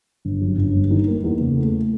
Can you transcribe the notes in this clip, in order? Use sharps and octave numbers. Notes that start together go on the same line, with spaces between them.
G1
F#2
G1
G2
D#3
A#3
E2
C#3
A3